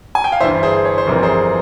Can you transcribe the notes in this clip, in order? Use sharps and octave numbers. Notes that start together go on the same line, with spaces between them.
G#5
G5
F5
G1 G2 E3 C5 E5
G#4 C5
C#5
C5
G1 F2 C3 E3 A#4
G#4 C5